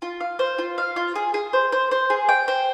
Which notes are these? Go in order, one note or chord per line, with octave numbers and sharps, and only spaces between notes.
F4
F5
C5
F4
F5
F4
G#4
G#4
C5
C5
C5
G#4
G5
C5